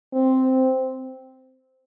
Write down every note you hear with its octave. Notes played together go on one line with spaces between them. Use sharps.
C4